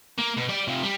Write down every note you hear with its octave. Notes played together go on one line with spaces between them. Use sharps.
A#3
B2
G3 D5
C3 F3
G3